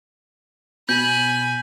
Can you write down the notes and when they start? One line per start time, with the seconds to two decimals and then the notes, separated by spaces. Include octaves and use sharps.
0.89 B2 G#5 B5 G6